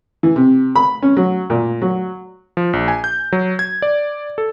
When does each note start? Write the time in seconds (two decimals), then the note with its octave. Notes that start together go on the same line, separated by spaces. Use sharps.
0.23 E3
0.36 C3
0.76 B5
1.02 C#4
1.17 F#3
1.50 A#2
1.82 F#3
2.57 F3
2.73 A#1
2.88 G#5
3.04 G6
3.32 F#3
3.59 G#6
3.82 D5
4.38 A4